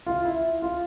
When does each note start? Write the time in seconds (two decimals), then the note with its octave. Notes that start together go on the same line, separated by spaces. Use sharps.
0.06 F4
0.25 E4
0.62 F4